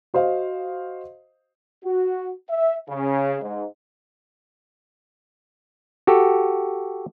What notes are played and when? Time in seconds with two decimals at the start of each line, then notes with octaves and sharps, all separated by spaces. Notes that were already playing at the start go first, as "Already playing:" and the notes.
0.14 F#4 C5 D#5 F5
1.84 F#4
2.49 E5
2.89 C#3
3.42 G#2
6.07 F#4 G4 A4